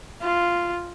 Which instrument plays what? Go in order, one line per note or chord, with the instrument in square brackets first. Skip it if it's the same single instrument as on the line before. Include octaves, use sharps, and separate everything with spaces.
[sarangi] F4